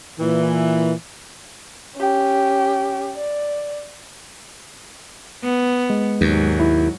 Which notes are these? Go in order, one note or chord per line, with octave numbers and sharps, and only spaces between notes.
A#2 E3
C#4 G4
D5
B3
G#3
D#2 G#2 F#3
E4